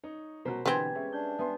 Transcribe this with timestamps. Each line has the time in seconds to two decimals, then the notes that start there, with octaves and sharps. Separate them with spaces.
0.04 D#4 C#5
0.45 B2 F#3 A#4 C5 B5
0.66 B2 D3 E3 B3 C4 G4 B4 G#5
0.95 G#3 C#4 E5
1.13 D4 G6
1.39 B3 E5 G#5 C6